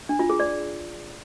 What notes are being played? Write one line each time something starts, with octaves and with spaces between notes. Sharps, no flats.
D4
F4
G#4
D5